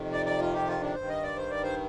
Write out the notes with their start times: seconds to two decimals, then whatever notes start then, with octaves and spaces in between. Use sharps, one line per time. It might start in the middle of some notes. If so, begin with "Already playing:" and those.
Already playing: F2 C3 D#3
0.12 D5
0.26 D5
0.39 F4
0.54 G4
0.67 F4
0.81 D4
0.95 G2 D#3 C5
1.09 D#5
1.23 D5
1.37 C5
1.50 D5
1.63 C5